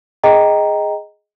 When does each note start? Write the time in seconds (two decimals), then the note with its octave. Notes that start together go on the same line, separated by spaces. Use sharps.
0.24 G#4 D#5 G5 A#5